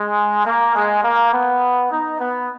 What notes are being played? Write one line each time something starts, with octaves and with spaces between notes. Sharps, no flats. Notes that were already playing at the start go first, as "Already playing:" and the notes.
Already playing: G#3
A#3
G#3
A#3
B3
D#4
B3